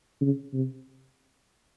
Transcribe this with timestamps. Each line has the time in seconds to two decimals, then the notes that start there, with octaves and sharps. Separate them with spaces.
0.21 C#3
0.53 C3